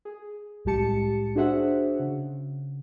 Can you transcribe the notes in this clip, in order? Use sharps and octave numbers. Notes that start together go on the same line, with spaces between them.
G#4
C2 A2 G#3 G4 A5 C#7
D4 F#4 G#4 C5 E5 F#5
C#3